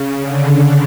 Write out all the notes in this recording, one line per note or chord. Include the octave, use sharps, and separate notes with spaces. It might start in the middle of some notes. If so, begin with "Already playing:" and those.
Already playing: C#3
D3